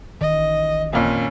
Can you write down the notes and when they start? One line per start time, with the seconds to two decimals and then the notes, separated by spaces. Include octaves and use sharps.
0.21 A1 D#3 D#5
0.93 F2 A#2 C#4